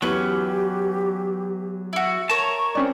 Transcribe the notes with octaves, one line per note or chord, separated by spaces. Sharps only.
E2 F#3 C#4 G4 B4
E4 F#4
A#4 C#5 A5 C#6
C4 C#4 D5